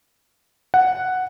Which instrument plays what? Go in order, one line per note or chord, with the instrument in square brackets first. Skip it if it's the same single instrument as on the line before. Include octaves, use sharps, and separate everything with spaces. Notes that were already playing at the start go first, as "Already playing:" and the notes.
[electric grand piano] F#5